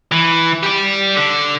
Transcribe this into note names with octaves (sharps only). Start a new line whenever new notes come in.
E3
G4 D5
D3